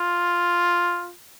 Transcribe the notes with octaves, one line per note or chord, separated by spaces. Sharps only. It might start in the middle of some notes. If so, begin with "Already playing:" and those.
Already playing: F4